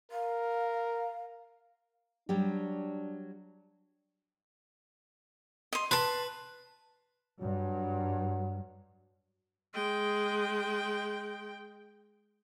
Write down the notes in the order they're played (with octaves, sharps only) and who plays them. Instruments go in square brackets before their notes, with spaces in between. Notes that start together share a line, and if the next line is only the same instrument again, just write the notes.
[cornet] A#4 [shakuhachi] F5
[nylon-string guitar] F#3 G3 G4 [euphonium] D4
[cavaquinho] D#5 C6
[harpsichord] B4 [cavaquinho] A5 C6
[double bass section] G2 [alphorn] F#3
[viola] G#3 G5